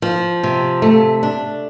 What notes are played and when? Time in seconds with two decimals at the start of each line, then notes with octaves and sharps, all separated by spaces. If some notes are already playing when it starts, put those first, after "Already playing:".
0.02 F3
0.43 C3
0.82 A3
1.23 D4